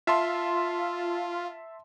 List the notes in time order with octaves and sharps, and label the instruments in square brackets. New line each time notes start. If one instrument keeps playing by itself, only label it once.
[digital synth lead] F4 [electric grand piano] E5 A5 C6